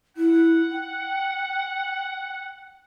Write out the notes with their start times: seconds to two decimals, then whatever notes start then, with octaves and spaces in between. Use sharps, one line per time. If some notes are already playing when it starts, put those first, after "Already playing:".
0.17 E4 F#5
0.71 G5